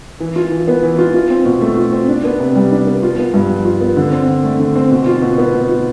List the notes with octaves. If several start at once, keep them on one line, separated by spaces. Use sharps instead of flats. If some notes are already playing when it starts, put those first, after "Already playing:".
E3
F4
E3
B3
E3
F4
F4
C4
B2
A3
F4
C4
D4
B3
C3
G3
D4
B3
F4
B3
G2
F3
F4
B3
D3
C4
D3
A3
D3
C4
B2
F4
B2
B3
B2
F4